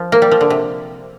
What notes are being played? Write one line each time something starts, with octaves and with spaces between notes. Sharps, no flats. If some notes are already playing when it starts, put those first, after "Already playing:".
Already playing: F3
A#3
G3
F3
D3
C3